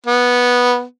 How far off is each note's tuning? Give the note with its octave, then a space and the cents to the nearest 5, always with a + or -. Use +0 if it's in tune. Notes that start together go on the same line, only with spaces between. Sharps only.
B3 -10